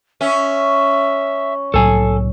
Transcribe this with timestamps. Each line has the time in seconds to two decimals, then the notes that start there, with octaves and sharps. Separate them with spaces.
0.21 C#4 E5
1.74 C2 A2 F#3 A4 G#5